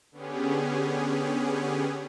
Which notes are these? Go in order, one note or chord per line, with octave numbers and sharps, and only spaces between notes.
D3 B3 C#4 G4 G#4